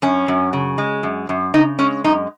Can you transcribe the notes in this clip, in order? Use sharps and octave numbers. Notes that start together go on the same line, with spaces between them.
F#2 C#4
F#2
C#3
G#3
F#2
F#2
C#3 D#4
G#3 C#4
F#2 D#4